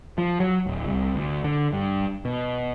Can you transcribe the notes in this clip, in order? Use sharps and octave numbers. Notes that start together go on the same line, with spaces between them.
F3
F#3
D1
C2
D2
D3
G2
B2